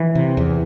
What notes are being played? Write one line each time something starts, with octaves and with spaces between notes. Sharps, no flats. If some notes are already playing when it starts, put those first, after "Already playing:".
Already playing: E3
C3
E2